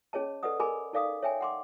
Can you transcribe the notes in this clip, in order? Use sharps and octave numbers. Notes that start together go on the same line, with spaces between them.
C#4 G#4 C#5 D#5 A5
A4 B4 D5 D#5 F#5 D#6
G#4 A#4 D#5 G#5 B5 D6
D#4 A4 D5 F5 D6 D#6
C#5 E5 G5 G#5
F#5 C6 D6